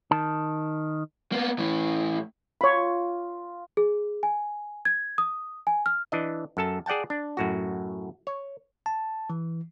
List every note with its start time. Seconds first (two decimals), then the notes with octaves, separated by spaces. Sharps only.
0.11 D#3 A5
1.32 A#3 B3
1.59 A2 E3
2.61 F4 C#5 B5
3.77 G#4
4.23 G#5
4.85 G#6
5.18 D#6
5.67 G#5
5.86 F6
6.12 E3 D4 D#5
6.57 F#2 A4 A5
6.86 G#4 D5 F#5 G5 A5
7.10 D4
7.37 F#2 A2 F#4
8.27 C#5
8.86 A5
9.30 E3